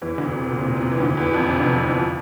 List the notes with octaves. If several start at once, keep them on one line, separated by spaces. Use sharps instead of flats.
E2 E3
D2 D3
C3
A#2
C3
A#2
C3
E3
D2 D3
E2 E3
F2 F3
C3
D3
C3
D2 D3
F3